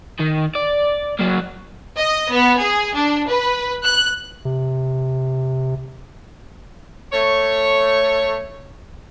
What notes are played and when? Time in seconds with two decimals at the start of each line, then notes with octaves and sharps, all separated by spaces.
0.20 D#3
0.55 D5
1.19 F#3 A#3
1.96 D#5
2.31 B3
2.59 G#4
2.93 D4
3.28 B4
3.85 F#6
4.45 C3
7.13 A3 C#5